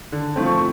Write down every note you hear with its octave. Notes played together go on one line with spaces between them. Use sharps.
D3
F3 A3 C4
C#6